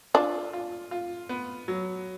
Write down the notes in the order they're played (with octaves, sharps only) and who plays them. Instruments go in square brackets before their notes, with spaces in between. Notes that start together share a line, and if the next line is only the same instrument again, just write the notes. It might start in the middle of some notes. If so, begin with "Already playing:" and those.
[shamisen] D4 [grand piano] F4
[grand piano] F4
F4
B3
F#3